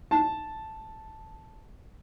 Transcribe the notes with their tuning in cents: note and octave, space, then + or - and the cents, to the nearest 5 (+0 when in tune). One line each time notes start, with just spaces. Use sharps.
A5 -5